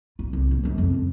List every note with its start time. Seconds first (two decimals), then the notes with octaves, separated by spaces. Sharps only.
0.19 F4
0.33 C2
0.51 A#3
0.63 C#2 F3
0.78 F2 C4
0.94 F2